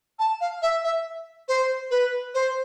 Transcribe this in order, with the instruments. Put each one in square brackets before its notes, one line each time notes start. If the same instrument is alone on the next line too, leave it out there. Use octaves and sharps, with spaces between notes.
[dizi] A5
F5
E5
E5
C5
B4
C5